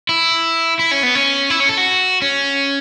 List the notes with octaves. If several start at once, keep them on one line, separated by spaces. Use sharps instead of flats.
E4
E4
C#4
B3
C#4
E4
C#4
A4
F#4
C#4